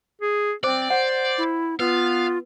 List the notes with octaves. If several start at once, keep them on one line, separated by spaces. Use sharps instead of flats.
G#4
C4 C5 D5 D6
C5 F#5
E4
B3 F4 B4 F5